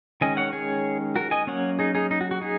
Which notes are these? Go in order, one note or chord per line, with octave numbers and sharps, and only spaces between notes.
D#3 G#3 C#4 D#5 G#5
C#5 F#5
G#4 C#5
F#4 A#4
D#5 G#5
F#3 A#3 C#4 C#5 F#5
D#4 G#4
D#4 G#4
D#4
F#4
F#4
D#4 G#4